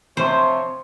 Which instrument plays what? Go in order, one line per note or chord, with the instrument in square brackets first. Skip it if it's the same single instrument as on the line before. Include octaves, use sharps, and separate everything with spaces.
[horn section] C3 F3 C#5 [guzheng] C5